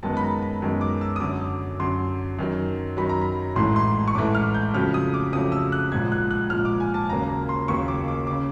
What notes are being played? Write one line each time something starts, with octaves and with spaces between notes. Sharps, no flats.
F#2 D#3 G#3 B3 A5
B5
A#5
B5
F#2 D#3 G#3 B3
D6
E6
D#6
F#2 D3 F#3 D6
F#2 D3 F#3 C6
F#2 D#3 F#3
F#2 D#3 F#3 B5
A#5
B5
A1 G#2 E3 A3 C6
C6
C#6
A1 G#2 E3 A3 D6
F6
G6
F2 C#3 F#3 A3 F6
D#6
D6
F2 C#3 F#3 A3 D#6
E6
F#6
A#1 G#2 F3 G#6
F#6
F#6
A#1 G#2 F3 F6
D6
G#5
A5
D#2 C#3 F#3 A#3 A#5
A#5
C6
D#2 C#3 F#3 A#3 C#6
D6
D6
C#3 D6